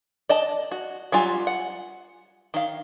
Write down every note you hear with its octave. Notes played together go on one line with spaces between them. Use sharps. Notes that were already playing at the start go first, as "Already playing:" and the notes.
D5 D#5 A5
F#4
F#3 G3 F4 G#5
F#5
D#3 F5